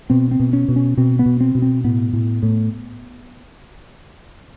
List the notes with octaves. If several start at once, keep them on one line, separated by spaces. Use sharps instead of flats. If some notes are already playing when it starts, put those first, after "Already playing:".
B2 C4
C4
B2
C#4
B2
C#4
B2 C4
B3
B2
C4
B2
C4
A2 B3
A2
A2